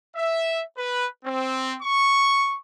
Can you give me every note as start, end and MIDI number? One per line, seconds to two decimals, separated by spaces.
0.15 0.61 76
0.76 1.06 71
1.25 1.75 60
1.82 2.55 85